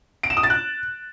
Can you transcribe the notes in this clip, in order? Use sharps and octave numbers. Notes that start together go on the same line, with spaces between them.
D7
E7
D#6
A6
F#6